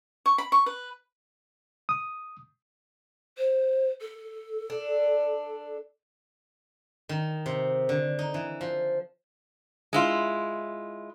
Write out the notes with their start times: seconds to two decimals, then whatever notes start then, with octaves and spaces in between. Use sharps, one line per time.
0.26 C#6
0.38 B5
0.52 C#6
0.66 B4
1.89 D#6
3.38 C5
4.01 A4
4.70 D4
7.09 D#3
7.46 C3
7.89 D3
8.19 D#4
8.34 E3
8.61 F3
9.93 G#3 E4 F4